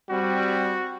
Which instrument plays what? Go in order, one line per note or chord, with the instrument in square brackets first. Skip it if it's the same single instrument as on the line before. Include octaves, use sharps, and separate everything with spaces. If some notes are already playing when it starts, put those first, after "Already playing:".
[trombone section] G3 C4 [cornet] F#4